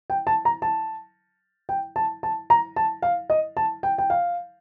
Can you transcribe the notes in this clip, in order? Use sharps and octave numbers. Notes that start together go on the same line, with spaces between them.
G5
A5
A#5
A5
G5
A5
A5
A#5
A5
F5
D#5
A5
G5
G5
F5